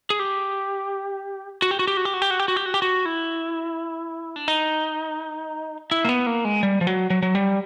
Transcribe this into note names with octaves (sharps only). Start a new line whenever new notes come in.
G#4
G4
F#4
G4
F#4
G4
F#4
G4
F#4
G4
F#4
G4
F#4
G4
F#4
G4
F#4
E4
D4
D#4
E4
A#3
B3
A#3
G#3
G3
F3
F#3
F#3
F#3
G3